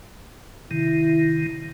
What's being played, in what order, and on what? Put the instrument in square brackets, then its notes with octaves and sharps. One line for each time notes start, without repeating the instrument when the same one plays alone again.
[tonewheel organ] C3 D#3 [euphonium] E4